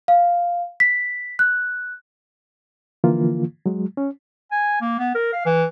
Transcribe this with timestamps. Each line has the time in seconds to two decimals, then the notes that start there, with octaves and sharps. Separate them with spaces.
0.08 F5
0.80 B6
1.39 F#6
3.04 D3 E3 F3 A#3 F4
3.66 F#3 G#3
3.97 C#4
4.52 G#5
4.81 A#3
4.99 B3
5.15 A#4
5.33 F5
5.46 E3